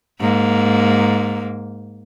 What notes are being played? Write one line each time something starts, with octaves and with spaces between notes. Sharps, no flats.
G#2 A#3